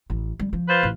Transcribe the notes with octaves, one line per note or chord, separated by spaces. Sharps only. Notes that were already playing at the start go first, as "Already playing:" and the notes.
A1
G3
F3
F4 B4 C5
A1